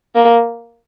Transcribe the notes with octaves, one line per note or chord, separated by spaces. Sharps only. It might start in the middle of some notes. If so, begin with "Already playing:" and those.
A#3